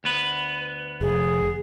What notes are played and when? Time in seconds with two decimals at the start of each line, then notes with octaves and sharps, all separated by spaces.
0.04 D2 B3 B4
1.01 F1 G#4